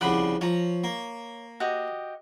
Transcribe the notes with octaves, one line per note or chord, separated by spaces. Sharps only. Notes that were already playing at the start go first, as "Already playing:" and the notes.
C2 C#3 F3 D5 F#5 B5
F3 C#5 A#5
A#3
F#4 G4 D#5